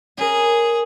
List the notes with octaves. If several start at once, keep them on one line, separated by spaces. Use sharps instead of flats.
C#4 G#4 A#4